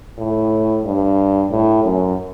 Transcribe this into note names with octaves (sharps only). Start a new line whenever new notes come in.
A2
G2
A2
F#2